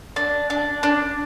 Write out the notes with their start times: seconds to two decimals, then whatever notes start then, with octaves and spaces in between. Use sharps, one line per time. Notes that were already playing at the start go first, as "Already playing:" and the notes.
0.16 D4
0.50 D4
0.83 D4